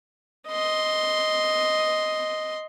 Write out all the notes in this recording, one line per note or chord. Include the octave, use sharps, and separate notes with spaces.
D#5 C6